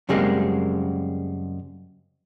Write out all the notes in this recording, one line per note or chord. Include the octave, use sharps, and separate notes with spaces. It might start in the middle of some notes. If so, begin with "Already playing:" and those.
F#2 C#3 G3 G#3 A#3 C4